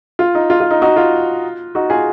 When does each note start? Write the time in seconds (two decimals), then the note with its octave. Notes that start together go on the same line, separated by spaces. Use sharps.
0.19 F4
0.35 D#4
0.50 F4
0.60 F4
0.71 D#4
0.82 D#4 F#4
0.96 F4
1.75 D#4 F#4
1.90 F4 G#4